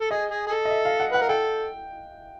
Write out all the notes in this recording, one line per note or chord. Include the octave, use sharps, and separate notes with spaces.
A4
G#4 D#5
G#4
G#4
A4
D#5
E5
F5
F#5
B4 F#5
A#4
A4 G5